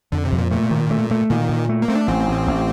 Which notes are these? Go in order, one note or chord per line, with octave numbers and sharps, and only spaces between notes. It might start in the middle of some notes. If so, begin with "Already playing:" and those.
F2 D3
C3
F2
A#2
A#2 A3
D#3
A3
A3
A#2 D#3
A#2
A3
A#3
A3 C4
D4
A1 C4
A1
A1